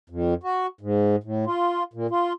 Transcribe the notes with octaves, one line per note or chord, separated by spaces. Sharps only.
F2
F#4
G#2
A2
F4
A#2
F4